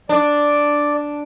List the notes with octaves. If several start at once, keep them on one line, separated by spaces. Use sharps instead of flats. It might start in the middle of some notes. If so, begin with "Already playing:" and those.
D4 D5